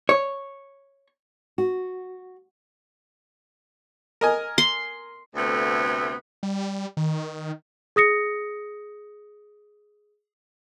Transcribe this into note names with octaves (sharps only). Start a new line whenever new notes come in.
C#5
F#4
A#4 D#5 G#5
C6
D2 C3 A3 B3
G3
D#3
G#4 D#6 A#6 C#7